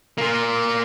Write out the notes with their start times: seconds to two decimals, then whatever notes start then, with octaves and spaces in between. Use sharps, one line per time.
0.18 A#3 F4